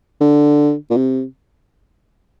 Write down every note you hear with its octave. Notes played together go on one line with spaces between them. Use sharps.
D3
A#2
C3